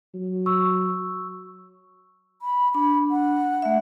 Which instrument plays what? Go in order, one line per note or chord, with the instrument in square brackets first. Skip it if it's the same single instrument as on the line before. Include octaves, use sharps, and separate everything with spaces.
[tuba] F#3
[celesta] C#6 E6
[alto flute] B5
[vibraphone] D4 [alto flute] B5
[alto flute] F#5
[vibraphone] A3 E5